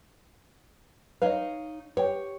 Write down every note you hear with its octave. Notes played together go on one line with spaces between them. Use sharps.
D#4 B4 C#5 D#5 F5
G4 B4 C#5 F#5 G5